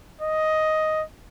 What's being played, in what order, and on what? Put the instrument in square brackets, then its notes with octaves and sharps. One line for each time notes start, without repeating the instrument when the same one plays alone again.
[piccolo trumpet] D#5